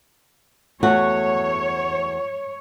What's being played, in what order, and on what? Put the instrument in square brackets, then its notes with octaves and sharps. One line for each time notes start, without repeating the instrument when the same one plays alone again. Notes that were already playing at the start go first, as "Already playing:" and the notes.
[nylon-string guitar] E2 A3 F#4 [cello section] C#5